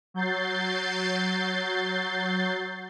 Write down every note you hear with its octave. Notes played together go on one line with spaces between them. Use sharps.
F#3 G6 A6 C7